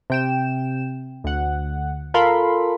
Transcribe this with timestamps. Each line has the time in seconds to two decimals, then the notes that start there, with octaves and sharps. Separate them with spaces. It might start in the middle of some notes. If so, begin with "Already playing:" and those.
0.10 C3 G5 E7
1.24 D2 F#5
2.14 F4 A4 A#4 F5 B5 C6